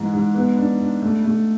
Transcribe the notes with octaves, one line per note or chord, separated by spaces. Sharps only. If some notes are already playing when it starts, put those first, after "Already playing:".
Already playing: G#2 E3 G#3
G#2
B3
D4
D4
A3
A3